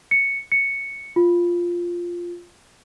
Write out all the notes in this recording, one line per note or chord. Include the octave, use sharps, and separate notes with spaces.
C#7
C#7
F4